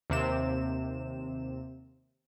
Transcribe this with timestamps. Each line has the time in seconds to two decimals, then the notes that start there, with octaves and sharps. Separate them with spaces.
0.10 D#2 C3 C4 E7